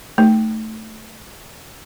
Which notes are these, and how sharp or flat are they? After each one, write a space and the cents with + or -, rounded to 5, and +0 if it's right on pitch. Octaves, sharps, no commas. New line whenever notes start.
A3 +0 D#4 +0